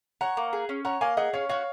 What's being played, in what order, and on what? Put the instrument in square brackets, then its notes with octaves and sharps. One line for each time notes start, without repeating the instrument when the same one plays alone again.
[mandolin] C#5 [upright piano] F#5 A#5
[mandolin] A#3
G#4
C#4
[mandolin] C#5 [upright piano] F#5 A#5
[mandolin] A#3 [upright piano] F5 G#5
[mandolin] G#4 [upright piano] D#5 F#5
[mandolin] C#4 [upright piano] C#5 F5
[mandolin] F#4 [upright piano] C#5 F5